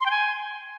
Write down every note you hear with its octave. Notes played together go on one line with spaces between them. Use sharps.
C6
G5
G#5